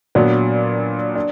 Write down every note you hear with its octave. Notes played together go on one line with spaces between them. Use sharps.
A#2 F#3 B3 D4
D4